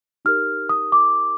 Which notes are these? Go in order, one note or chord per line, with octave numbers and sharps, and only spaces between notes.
D#4 G4 A#4 F6
D#6
D6